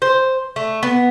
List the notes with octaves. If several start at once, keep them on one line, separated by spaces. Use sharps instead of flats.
C5
A3
B3